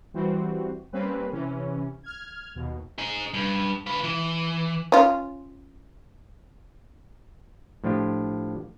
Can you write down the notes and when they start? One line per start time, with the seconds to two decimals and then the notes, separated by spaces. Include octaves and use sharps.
0.14 E3 G3 C4 F#4
0.92 G3 A#3 C4 C#4 B4
1.32 C3 E3 C#4
2.03 F6 G#6
2.55 D#2 B2
2.98 D#4 G#4
3.34 G2
3.86 F4 B4
4.04 E3
4.92 C#4 F4
7.84 A2 F3 D4 F4 G4